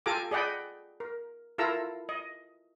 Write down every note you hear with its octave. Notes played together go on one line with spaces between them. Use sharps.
F4 G4 A4 G#5 A#5 D6
G#4 D5 D#5 F#5 G5 B5
A#4
E4 F4 A4 A#4 A#5 E6
D#5